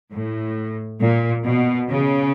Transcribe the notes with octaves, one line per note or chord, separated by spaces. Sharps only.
A2
A#2
B2
C#3